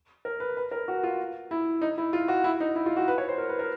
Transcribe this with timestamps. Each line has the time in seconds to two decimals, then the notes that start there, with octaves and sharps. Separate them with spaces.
0.25 A#4
0.40 B4
0.57 B4
0.72 A#4
0.88 F#4
1.03 F4
1.51 E4
1.82 D#4
1.98 E4
2.13 F4
2.28 F#4
2.44 E4
2.60 D#4
2.76 E4
2.86 F4
2.97 F#4
3.08 B4
3.18 C#5
3.28 C5
3.38 A#4
3.49 B4
3.59 A#4